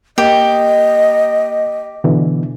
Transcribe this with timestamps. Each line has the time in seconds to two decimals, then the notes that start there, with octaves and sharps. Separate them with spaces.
0.18 A#3 G4 D#5
2.04 B2 D3 E3